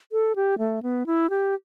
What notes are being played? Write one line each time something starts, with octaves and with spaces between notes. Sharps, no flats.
A4
G4
A3
B3
E4
G4